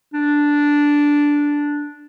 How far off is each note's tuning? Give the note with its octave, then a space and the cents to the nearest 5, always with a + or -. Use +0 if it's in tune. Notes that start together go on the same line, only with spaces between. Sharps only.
D4 -5